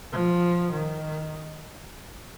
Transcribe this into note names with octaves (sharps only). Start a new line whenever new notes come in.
F3
D#3